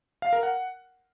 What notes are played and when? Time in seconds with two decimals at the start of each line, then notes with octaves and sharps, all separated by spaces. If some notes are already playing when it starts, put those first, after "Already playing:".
0.22 F5
0.33 A#4
0.43 F#5